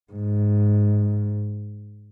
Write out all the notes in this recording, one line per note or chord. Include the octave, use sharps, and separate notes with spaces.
G#2